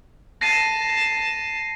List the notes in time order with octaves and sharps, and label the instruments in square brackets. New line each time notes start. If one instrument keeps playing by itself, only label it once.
[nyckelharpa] A5 [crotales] A#6 C7 D#7